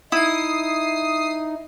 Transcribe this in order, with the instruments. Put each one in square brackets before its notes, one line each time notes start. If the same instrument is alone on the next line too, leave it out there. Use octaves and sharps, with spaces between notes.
[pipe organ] D#4 [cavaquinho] E4 [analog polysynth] D#6 C7